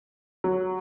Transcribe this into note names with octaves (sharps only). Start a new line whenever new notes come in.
F#3